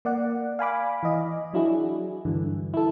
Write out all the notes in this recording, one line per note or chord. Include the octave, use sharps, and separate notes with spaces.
A#3 D5 F#5
F5 G#5 B5 D6
E3 D#5
F#3 D4 E4 F#4 G#4
G2 D3 E3
E4 A4